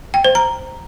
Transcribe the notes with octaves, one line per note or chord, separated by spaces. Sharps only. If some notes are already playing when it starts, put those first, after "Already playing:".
G5
C5
A#5